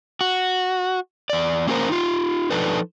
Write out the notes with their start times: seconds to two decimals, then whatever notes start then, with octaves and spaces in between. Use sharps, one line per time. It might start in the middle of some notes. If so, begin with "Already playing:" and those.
0.21 F#4
1.30 E2 D5
1.67 A#3 C#4 G4 G#4 A#4 C5
1.89 D#4 F4
2.51 F3 D4 D#4 A4 B4